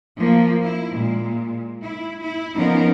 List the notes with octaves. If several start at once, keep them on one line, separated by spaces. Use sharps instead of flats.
F3 A#3
E4
A#2 G#3
E4
E4
F3 B3 C#4 D#4 A#4